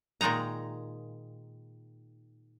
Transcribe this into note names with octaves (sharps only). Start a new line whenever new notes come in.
A#2 D#3 G#3 D#4 A#5